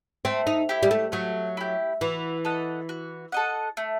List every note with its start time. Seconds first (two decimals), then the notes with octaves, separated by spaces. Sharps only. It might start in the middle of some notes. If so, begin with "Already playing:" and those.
0.25 A3 C4
0.47 D#4
0.69 E4 G4
0.83 G3
0.91 A3
1.12 F#3 A3
1.57 E4 G4
2.01 E3 F#4
2.45 A4 D#5 F#5
2.89 F#4
3.32 A4 D#5 F#5
3.77 A3